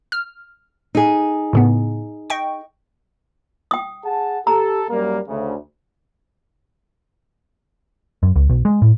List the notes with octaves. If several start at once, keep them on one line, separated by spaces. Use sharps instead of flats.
F6
D#4 G#4
A2 C#3 B3
D#5 G5 C#6
G5 D#6
G#4 F#5 A5
G4 A4 A#5
F#2 G3 A#3
D2 C#3
F#2
C#2
B1
G#3
A2